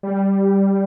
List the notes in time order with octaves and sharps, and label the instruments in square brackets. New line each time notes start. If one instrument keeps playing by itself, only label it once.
[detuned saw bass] G3